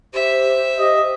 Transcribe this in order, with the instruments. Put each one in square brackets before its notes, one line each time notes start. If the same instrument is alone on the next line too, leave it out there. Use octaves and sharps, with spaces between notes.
[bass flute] G4 [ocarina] C5 [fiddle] E5
[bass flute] G4 [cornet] D#5